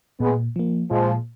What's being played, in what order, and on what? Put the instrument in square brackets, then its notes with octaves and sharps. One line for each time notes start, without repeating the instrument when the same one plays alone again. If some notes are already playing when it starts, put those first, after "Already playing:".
[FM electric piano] A#2 [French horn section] G#3 B3
[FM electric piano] F3 A#3
[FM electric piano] A#2 [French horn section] F3 G#3